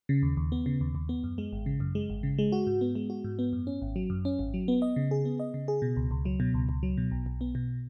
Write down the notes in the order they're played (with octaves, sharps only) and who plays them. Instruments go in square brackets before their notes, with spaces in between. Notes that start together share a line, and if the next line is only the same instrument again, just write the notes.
[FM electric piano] C#3
D#2
D#2
B3
C#3
D#2
D#2
B3
F#2
G#3
G#1
C#3
F#2
G#3
G#1
C#3
G#3
F#4
G#2
B3
G#3
F#4
G#2
B3
F#2
C#4
G#1
F#3
F#2
C#4
G#1
F#3
B3
D#5
C#3
G#4
B3
D#5
C#3
G#4
B2
C#2
C#2
F#3
B2
C#2
C#2
F#3
B2
B1
B1
B3
B2